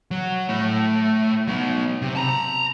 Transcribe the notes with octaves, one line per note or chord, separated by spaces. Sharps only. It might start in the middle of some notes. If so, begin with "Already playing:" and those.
F#3
A2 A3
F#3 B3
C3
A5 A#5